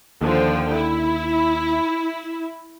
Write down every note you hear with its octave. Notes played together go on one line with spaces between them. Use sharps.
D#2 D3 F3 G5
E4